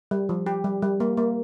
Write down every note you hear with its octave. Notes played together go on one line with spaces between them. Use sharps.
G3
F3
G4
G3
G3
A#3
A#3